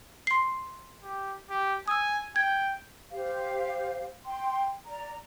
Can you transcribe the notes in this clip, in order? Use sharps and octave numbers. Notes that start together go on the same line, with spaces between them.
C6 C7
G4
G4
G#5 D#6 E6
G5 G#6
G4 C5 F5
G5 C6
D5 A#5